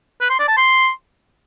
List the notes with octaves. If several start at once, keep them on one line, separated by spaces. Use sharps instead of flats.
B4
C6
D5
A5
C6